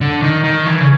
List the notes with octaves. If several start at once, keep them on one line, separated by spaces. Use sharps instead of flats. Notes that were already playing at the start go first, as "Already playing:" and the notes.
D3
D#3
D#3
E3
C#3